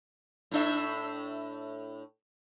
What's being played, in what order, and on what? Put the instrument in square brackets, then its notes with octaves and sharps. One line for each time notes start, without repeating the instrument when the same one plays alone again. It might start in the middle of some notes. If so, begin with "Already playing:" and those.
[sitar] A2 D4 E5